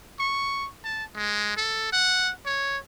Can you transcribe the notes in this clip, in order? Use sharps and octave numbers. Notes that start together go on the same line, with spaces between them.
C#6
A5
G#3
A4
F#5
C#5